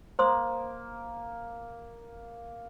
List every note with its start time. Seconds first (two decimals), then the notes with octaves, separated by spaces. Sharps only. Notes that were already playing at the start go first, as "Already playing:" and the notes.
0.19 A#3 C5 C6 D#6